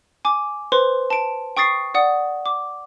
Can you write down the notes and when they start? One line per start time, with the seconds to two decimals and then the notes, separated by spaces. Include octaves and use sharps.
0.25 G#5 D6
0.72 B4 C5 C6
1.10 A5 D7
1.57 G5 C#6 D#6 A6 C7
1.94 D5 F#5 D#6
2.46 D6